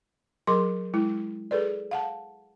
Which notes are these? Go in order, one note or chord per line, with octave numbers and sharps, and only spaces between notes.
F#3 G#4 A#4 C6 D6
G#3 E4
G#4 A4 B4 D5
F5 F#5 A5